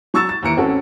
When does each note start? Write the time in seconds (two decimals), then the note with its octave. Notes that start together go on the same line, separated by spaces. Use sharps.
0.14 F#3 C#6 E6 A6 E7
0.29 A6
0.43 D#2 E3 A#5 C#7 D7
0.57 A1 C4 C#4 F#4 A4